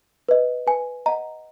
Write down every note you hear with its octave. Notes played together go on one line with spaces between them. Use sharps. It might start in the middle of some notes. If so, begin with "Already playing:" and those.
B4 D#5
B4 G#5
D#5 F#5 A#5